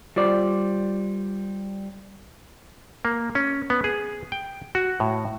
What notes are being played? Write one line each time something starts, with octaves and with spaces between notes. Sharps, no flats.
G3 F4 C5 D5
A#3
C#4
B3
G#4
G5
F#4
A2